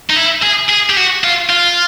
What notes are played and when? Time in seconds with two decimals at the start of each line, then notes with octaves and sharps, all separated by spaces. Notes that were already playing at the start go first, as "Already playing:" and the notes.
0.10 D#4
0.16 E4
0.43 G#4
0.70 G#4
0.90 G4
0.97 F#4
1.24 F4
1.50 F4